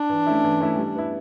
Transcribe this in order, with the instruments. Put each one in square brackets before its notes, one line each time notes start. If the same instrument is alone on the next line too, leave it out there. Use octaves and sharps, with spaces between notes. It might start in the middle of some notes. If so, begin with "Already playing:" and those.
Already playing: [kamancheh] D4
[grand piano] E3
A3 C#4 E4
E3
A3 C#4 E4
G3
B3 E4